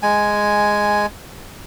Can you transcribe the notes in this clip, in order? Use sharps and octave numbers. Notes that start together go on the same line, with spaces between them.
G#3 G#5